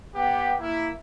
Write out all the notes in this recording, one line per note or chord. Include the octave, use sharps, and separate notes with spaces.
B3 G4
A#3 E4